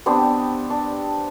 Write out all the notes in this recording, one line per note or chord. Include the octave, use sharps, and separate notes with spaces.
B3 C4 D4 G4
D4